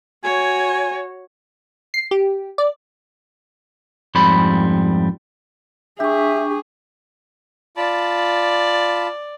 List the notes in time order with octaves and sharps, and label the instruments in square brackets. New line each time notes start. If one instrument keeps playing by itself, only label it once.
[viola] F#4 C#5 [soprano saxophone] G#5
[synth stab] C7
G4
D5
[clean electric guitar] F2 G#2 G3 C5 B5
[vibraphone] D4 C#6 [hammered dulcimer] G4 [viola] G#4 [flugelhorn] E5
[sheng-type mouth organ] F4 A5 B5 [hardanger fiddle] D5